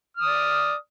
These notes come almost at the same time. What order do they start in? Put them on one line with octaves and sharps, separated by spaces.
F6 D#6 D5